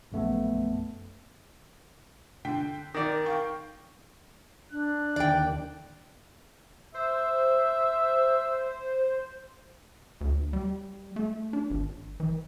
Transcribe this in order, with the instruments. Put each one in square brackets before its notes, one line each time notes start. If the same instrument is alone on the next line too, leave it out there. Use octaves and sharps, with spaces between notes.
[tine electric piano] A#1 F#2 A3 B3
[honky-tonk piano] D3 G5 B6
[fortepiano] D#3 D5 [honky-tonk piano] A#6
[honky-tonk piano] F5 G5 C#6
[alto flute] D4 [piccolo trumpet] F#6
[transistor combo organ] D#2 D3 [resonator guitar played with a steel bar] D5 G5
[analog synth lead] C5 [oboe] E5
[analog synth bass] D2
G3
A3
D4
G#1
E3